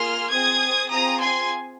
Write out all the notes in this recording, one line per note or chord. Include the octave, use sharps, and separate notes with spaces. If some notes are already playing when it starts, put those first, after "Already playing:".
Already playing: A#3 F4 G#4 C6 F6
C4 G#4 D#6 G#6
C4 F4 G#4 A#5 D#6
G#5 C6